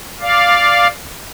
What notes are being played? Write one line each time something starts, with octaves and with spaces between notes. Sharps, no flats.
D5 F5